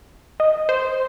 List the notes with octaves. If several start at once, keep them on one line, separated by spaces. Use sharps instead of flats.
D#5
C5